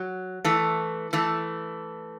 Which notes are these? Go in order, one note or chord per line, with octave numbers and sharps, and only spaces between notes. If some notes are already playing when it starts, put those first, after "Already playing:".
Already playing: F#3
E3 A3
E3 A3